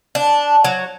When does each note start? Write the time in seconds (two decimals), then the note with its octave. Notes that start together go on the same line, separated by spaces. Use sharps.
0.15 D4
0.64 F#3